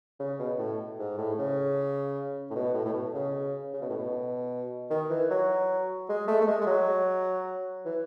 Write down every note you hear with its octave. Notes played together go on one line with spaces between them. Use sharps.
C#3
B2
A2
G#2
A2
C#3
A2
B2
A2
A2
B2
C#3
C#3
B2
A2
B2
D#3
E3
F#3
G#3
A3
A3
G#3
G#3
F#3
E3